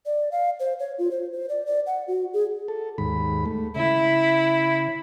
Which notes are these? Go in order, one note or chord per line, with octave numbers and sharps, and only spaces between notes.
D5
F5
C5
C#5
F4
C5
C5
D5
D5
F#5
F#4
G#4
A4
D#2 G#2 B5
A3
C#3 E4